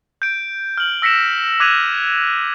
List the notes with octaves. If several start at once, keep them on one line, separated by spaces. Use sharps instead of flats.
G6 D7
F6 F#7
E6 A#6 B6 C#7 E7
D6 F#6 G#6 B6 D#7 F7